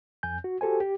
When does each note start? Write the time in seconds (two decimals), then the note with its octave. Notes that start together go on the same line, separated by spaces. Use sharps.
0.23 F2 G#5 G6
0.44 F#4
0.61 F#4 G4 A4 C5 G#5
0.80 G4